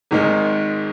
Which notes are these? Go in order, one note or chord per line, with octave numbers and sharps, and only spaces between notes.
G#1 G#2 D#3 G#3